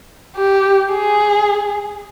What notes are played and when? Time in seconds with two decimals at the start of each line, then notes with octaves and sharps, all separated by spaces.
0.36 G4
0.92 G#4